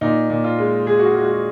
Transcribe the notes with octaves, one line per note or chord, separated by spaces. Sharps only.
A#2 D#4
A#2
F4
G#3
G#3 G#4
F#4
G#3 F4
F#4